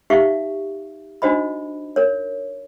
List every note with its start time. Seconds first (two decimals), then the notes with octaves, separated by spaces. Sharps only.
0.10 D#4 G4 E5 F5 C#6
1.22 D4 D#4 F#4 C5 D#5 B5
1.96 A#4 C#5